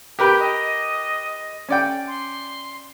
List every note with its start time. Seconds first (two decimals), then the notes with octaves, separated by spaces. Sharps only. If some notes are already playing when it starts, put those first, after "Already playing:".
0.19 G4 A#4 B4 G5
0.40 D#5
1.69 C#4 D5 G5
2.08 C6